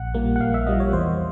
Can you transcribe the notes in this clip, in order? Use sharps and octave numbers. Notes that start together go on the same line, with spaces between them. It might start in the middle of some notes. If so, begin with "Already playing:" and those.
Already playing: A#1 F#5
A#2 G3 A#3
F#5
A#1 F5
E5
A#2 G3 A#3 D#5
C#5
E2 C5